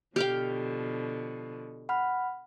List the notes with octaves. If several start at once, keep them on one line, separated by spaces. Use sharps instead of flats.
B2 D3 F3 G4 F5 G5
F#5 B5 F6